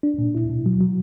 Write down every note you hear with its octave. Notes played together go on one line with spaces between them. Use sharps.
D4
A#2
E4
B2
F#3
F#3